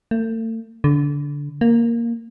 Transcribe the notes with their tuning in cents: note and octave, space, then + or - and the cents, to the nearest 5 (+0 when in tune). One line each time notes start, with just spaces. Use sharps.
A3 +40
D3 -20
A#3 +0